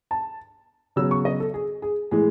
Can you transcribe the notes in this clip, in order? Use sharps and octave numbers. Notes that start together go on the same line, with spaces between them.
A5
C#3 F#3 B3 E6
C#6
D#5
A4
G#4
G#4
A2 E3 G#3 G#4